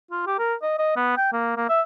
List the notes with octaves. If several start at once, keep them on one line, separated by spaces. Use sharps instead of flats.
F4
G4
A#4
D#5
D#5
B3
G5
A#3
A#3
E5